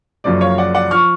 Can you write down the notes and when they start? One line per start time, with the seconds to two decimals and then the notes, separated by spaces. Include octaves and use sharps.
0.24 F#1 F#2 F3 D5
0.41 C#5 F5
0.58 D5 F#5
0.74 D5 F#5
0.91 F3 C#6 F6